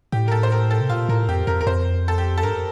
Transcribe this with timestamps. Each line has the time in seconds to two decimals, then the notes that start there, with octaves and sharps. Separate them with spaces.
0.12 A2 G4
0.28 A#4
0.32 A4
0.43 C5
0.52 A#4
0.71 A4
0.81 C3
0.89 A#2 F4
1.09 A2 A#4
1.29 F2 G4
1.47 F2 A#4
1.61 A#4
1.67 F2 C5
2.08 A4
2.18 G4
2.38 A4
2.43 G2 A#4